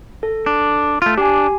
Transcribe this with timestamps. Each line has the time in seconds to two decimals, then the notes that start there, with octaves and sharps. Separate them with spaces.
0.23 A4
0.46 D4
1.02 A3 F4
1.18 D4 G4 G#5